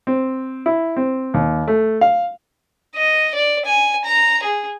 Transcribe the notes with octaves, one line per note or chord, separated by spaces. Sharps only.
C4
E4
C4
D#2
A3
F5
D#5
D5
G#5
A#5
G#4